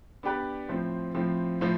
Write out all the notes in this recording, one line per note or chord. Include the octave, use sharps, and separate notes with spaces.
B3 D4 G4 B4 D5
A2 F3 C4
A2 F3 C4
A2 F3